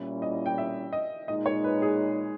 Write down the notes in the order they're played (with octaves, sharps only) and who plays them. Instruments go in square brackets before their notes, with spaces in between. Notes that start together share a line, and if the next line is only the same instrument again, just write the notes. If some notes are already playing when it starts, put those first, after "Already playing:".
Already playing: [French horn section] A#2 G3 C#4 E4
[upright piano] D#5
G5
E5
D#5
[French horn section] A#2 G#3 D#4 [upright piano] D#5
[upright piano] C#5
B4
G#4